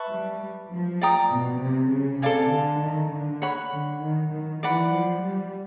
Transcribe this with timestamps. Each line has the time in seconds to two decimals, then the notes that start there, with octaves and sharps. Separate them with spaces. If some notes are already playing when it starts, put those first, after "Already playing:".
Already playing: B4 E5 A5 C#6
0.11 G3
0.71 F3
1.01 D5 G5 A#5 D#6
1.32 B2
1.61 C3
1.91 C#3
2.22 C3 A4 D5 F5 G#5
2.52 D3
2.82 D#3
3.12 D3
3.42 C#5 F#5 B5
3.72 D3
4.02 D#3
4.32 D#3
4.63 E3 D5 F#5 B5
4.92 F3
5.23 G3